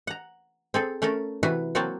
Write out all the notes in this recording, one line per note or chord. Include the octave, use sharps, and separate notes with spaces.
F#5 A#5
C4 G#4 A4
A3 C#4 A4 A#4
C3 E3 E4 F#4 B4
F#3 A#3 C4 F#4 C#5 A5